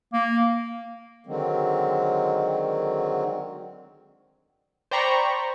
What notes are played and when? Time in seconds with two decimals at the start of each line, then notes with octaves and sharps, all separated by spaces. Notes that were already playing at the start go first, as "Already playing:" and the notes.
0.13 A#3
1.26 D3 D#3 F#3 G#3 C4
4.91 C5 D5 G5 A#5 B5 C#6